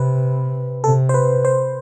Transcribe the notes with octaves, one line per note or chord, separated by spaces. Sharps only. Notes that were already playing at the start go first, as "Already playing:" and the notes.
Already playing: C3 B4
C3 A4
C5
B4
C5